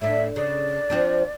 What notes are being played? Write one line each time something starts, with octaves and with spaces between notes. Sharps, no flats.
A2 D4 E5
C#3 D5
F3 C4 D4